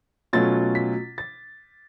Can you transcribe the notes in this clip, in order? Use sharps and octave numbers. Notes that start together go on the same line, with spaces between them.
B2 F#3 A3 C#4 F4 A6
B6
A6